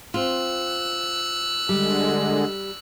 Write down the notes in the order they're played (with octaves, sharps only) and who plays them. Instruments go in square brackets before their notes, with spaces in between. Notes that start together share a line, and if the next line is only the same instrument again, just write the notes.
[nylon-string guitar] C4 F4 [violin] E6 F#6
[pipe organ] D3 G#3 [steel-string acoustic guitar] G3